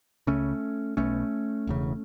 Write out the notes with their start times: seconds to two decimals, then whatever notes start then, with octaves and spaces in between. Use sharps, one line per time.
0.27 C#2 C#3 A3 C#4
0.97 B1 B2 A3 C#4
1.67 E1 E2 C#3